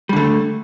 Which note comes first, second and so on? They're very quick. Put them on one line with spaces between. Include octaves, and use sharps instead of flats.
G3 D3 A3